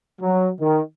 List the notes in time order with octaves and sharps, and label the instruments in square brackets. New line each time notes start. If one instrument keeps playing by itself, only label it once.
[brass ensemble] F#3
D#3